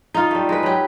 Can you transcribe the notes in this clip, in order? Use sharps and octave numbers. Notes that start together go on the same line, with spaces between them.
D#4 F4
G3 A3
G#3 B4
F#3 G4